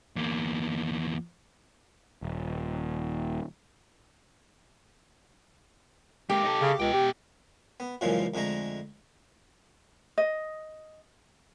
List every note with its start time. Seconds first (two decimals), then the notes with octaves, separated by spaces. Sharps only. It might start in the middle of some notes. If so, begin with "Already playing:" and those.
0.16 E2 A#3
2.22 D#1
6.30 G#3 A#3 G4
6.43 D#4 A4
6.61 C#3
6.80 C#2 B2 G5
6.93 G4
7.80 B3
8.01 F#2 A#2 C#3 E3 F3 G#3
8.34 F2 D3 G#3 A3 A#5
10.18 D#5